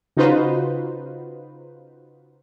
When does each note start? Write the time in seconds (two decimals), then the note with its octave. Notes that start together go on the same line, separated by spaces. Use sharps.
0.17 C#3 D#4 F4 F#4 B4 C5